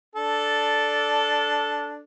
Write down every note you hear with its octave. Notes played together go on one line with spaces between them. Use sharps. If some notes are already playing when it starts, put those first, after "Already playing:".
D4 A4